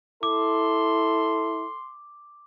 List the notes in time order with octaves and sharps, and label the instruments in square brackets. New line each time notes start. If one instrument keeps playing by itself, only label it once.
[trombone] E4 [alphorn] A4 [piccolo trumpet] C6 [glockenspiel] D6